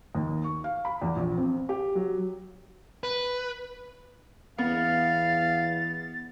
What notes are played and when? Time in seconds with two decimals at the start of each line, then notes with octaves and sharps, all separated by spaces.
0.15 D#2
0.44 C#6
0.64 F5
0.85 B5
1.02 E2
1.16 A#1
1.38 C4
1.69 G4
1.95 F#3
3.04 B4
4.58 E2 B3 F5 A6